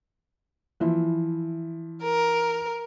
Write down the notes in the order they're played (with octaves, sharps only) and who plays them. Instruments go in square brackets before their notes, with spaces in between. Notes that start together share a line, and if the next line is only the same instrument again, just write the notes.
[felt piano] E3 F3 E4
[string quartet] A#4